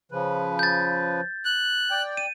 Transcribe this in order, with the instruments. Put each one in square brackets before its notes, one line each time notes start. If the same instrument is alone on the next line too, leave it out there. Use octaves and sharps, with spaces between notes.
[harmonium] C#3 F3 B4
[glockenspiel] G6 A6
[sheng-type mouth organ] F#6
[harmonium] D5 G5
[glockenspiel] D#7